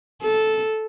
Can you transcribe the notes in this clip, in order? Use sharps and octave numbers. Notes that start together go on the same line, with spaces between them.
A4